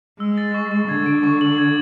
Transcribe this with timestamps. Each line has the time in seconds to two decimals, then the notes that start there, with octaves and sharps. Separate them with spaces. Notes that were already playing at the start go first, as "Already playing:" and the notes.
0.20 G#3 E6
0.38 A6
0.54 C#6
0.72 C#6
0.89 D3 G#6
1.06 D7
1.24 C#6
1.41 F#7
1.58 G#6